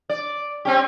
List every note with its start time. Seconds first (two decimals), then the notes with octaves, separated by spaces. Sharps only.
0.09 D5
0.65 C4 C#4 G4